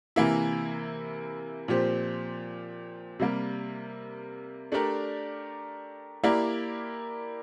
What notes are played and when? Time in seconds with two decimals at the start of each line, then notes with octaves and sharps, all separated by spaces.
0.16 C3 E3 A#3 E4
1.68 A#2 F3 C4 G4 C5
3.19 C3 G3 A#3
4.72 A3 D4 G4 A#4 D5
6.23 A#3 E4 G4 A#4 D5